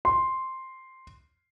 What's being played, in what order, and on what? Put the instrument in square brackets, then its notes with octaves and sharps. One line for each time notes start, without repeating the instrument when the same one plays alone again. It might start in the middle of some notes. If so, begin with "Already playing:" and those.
[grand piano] C6